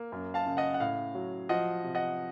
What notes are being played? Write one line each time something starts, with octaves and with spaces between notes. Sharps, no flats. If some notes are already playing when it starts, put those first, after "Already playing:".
Already playing: A#3
F#2
F5 A5
C#3
D#5 F#5
F#5
A2 F5
F#3
F3 D#5 F#5
C3
D#5 F#5